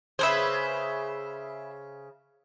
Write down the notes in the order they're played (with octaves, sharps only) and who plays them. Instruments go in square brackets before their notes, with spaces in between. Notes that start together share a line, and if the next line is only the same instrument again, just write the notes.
[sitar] C#3 C5 [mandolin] G#4 B4 E5